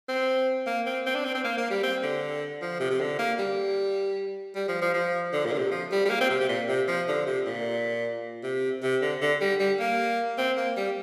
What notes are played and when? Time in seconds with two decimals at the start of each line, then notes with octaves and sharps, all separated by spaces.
0.08 C4
0.67 A#3
0.86 C4
1.06 C4
1.15 D4
1.25 C4
1.35 C4
1.44 A#3
1.57 A#3
1.70 G3
1.83 C4
2.03 D3
2.62 F3
2.80 C3
2.91 C3
3.00 D3
3.19 A#3
3.39 G3
4.55 G3
4.68 F3
4.82 F3
4.94 F3
5.33 D3
5.46 A#2
5.53 D3
5.58 C3
5.71 F3
5.91 G3
6.05 G3
6.10 A#3
6.21 C4
6.30 C3
6.40 C3
6.49 A#2
6.68 C3
6.88 F3
7.08 D3
7.27 C3
7.46 A#2
8.43 C3
8.83 C3
9.02 D3
9.21 D3
9.41 G3
9.60 G3
9.79 A#3
10.38 C4
10.57 A#3
10.77 G3